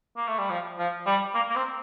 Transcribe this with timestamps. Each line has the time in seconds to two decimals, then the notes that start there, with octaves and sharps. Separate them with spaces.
0.17 A#3
0.28 A3
0.38 G3
0.50 F3
0.78 F3
1.06 G3
1.34 A#3
1.50 A#3
1.56 C4